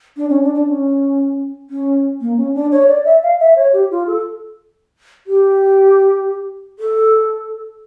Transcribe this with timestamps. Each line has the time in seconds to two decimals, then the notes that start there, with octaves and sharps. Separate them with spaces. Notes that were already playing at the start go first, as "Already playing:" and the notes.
0.17 D4
0.29 C#4
0.43 D4
0.55 D4
0.68 C#4
1.70 C#4
2.21 A#3
2.37 C#4
2.55 D4
2.72 C#5
2.88 D5
3.05 E5
3.23 F5
3.39 E5
3.56 C#5
3.73 G4
3.91 F4
4.07 A4
5.27 G4
6.79 A4